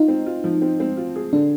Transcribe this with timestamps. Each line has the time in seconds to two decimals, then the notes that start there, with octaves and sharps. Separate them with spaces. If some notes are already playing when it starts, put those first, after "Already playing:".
Already playing: D#4 F4
0.08 C4
0.26 F4
0.44 F3
0.62 C4
0.80 C4
0.97 F4
1.16 G#4
1.33 D3 D4